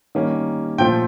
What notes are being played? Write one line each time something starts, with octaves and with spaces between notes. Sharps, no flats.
D#3 G3 A#3 C#4
A#2 F3 A3 G5